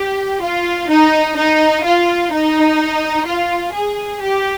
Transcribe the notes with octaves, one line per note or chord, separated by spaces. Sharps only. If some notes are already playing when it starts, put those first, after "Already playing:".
Already playing: G4
F4
D#4
D#4
F4
D#4
F4
G#4
G4